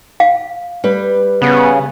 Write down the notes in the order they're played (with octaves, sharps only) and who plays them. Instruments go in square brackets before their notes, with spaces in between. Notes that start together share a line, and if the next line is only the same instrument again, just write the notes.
[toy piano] F5
[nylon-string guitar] G3 B4
[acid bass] C#3 [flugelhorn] B3